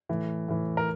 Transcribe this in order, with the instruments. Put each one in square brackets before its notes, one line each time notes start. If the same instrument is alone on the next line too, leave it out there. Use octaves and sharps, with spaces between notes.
[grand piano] A2 E3
A2 E3
A#4